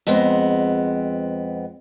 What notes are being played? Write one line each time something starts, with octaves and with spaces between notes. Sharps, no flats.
F2 G#3 B3 C4